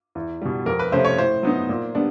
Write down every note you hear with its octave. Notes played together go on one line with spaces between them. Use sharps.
E2
B2 G3
F2 A#4
B4
C3 F3 A3 C#4 C5
C#5
A2 C5
F#3 B3 D#4
A#2
G3 B3 D4